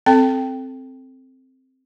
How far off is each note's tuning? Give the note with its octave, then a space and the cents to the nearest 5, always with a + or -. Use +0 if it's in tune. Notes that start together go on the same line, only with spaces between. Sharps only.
C4 +0 A4 +0 G5 +0